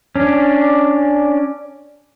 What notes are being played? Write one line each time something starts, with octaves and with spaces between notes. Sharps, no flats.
C#4 D4